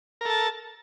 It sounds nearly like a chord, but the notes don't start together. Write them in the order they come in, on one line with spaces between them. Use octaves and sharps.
A#4 A4 A5